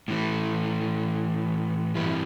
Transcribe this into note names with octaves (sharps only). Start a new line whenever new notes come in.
A2 E3 A3
G2 E3 G3 E4